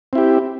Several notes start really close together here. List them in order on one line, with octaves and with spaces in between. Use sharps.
C4 E4 G4